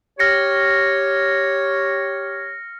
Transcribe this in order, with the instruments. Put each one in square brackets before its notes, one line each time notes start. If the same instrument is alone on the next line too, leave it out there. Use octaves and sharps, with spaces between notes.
[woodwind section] G4 C#5 [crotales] F6 A#6 C#7